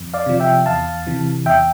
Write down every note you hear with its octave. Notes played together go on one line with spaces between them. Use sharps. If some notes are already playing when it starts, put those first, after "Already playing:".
Already playing: F2
D5 F5
C3 F3
E5 G5
E2 F5 A5
C3 E3
E2 E5 G5